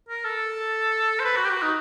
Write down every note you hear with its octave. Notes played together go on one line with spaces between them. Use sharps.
A#4
A4
C5
B4
F#4
G4
F#4
D#4